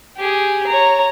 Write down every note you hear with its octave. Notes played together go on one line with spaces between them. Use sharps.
G4 G#4
C#5 A#5